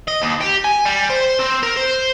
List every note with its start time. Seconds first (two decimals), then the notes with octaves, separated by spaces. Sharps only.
0.08 D#5
0.22 D#2
0.41 G4
0.64 G#5
0.85 G3
1.10 C5
1.40 C4
1.63 A#4
1.77 C5